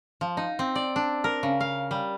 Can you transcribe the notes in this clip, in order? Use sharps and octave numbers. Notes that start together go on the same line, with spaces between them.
F3
D#4
C4
D5
D4
A#4
C#3
F5
G3